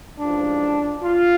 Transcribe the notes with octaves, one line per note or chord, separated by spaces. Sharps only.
A1 G#2 F3 D4
F4